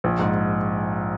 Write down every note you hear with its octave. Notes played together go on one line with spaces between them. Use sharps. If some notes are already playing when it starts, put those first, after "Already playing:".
A#1
G#2